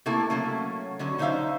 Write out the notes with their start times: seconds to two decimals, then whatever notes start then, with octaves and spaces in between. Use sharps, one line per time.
0.06 C3 A3 A#3 E4 A4
0.30 F#3 A3 A#3 C#4
0.99 D3 F#3 C#4
1.18 D3 D#4 C5 C#5 E5 F5